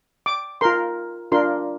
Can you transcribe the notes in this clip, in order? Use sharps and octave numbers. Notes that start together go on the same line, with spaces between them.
D6
F4 A#4 C6
D4 F4 A#4 C6